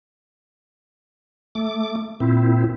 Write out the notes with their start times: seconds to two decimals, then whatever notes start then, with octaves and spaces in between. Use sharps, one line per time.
1.55 A3 D6
2.20 A#2 C4 E4